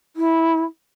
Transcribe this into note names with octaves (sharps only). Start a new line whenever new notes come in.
E4